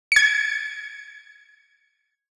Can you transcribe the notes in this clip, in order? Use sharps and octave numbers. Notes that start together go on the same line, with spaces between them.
G#6 C#7